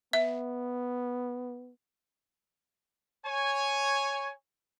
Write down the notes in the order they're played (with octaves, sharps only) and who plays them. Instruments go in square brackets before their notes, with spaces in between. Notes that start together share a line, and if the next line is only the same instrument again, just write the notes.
[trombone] B3 [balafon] E5
[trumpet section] C#5 G#5